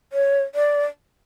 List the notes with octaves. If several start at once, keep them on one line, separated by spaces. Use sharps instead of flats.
C#5
D5